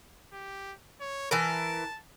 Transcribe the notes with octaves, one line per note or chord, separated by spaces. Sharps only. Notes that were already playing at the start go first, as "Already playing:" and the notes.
G4
C#5
E3 A#4 A5